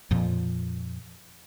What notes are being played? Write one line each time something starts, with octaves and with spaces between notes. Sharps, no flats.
F2 A#2 F3